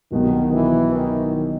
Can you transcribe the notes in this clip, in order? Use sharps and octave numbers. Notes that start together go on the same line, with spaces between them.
C2 B2 D#3 F#3 B3
E3
D#3